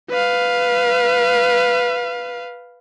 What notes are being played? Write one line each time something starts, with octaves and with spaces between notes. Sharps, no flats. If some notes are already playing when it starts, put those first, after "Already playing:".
B4 F5